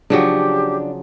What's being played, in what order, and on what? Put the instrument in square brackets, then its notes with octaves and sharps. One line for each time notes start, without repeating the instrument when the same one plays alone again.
[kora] C#3 F3 F#3 [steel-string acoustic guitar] D4 [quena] G4